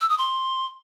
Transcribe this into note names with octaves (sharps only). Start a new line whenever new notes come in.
E6
D#6
C6